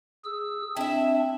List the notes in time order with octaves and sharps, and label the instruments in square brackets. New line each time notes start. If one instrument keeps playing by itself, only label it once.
[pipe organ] G#4 E6
[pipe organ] C4 D4 [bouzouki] E4 E5